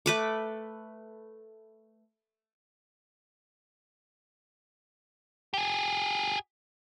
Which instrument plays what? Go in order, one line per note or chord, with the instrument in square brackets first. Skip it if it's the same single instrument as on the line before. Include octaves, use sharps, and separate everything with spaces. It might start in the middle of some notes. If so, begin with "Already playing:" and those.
[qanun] A3 B4 D6
[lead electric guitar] G4 G#4